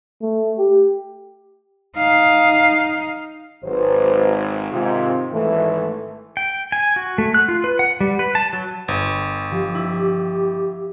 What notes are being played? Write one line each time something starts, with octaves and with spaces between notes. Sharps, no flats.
A3
G4
D#4 F5
G#1 F#3 B4 C5
G#2 C3 D#3 C4 F4
G#1 E3 A3
G5
G#5
F#4
A3
F#6
F4
B4
F#5
G3
B4
A5
F#3
G1
F3 G4
E4